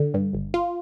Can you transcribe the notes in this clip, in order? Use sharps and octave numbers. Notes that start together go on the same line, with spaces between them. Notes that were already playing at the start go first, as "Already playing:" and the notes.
Already playing: D3
G2
G1
F4